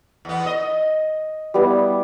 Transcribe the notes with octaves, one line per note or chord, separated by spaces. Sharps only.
E2 B3
D#5
G3 B3 E4